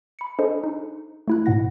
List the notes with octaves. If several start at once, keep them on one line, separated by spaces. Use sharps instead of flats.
B5 C#7
D4 G#4 A4 C5 D#5 G#5
D#4
A3 E4 F#6
G#2 B2 F#5 A#6